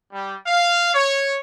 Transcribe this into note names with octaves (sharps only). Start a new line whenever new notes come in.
G3
F5
C#5